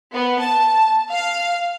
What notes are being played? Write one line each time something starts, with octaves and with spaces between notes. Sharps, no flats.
B3
A5
F5